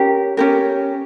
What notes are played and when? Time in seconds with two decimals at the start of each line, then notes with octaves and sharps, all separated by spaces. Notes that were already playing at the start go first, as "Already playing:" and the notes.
Already playing: C#4 G4 A#4
0.37 C#4 G4 A#4